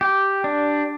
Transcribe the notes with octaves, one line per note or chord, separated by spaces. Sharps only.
G4
D4